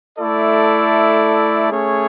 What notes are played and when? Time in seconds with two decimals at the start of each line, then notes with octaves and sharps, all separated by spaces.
0.16 A3 E4 A4 D5
1.71 A3 C#4 G#4 C#5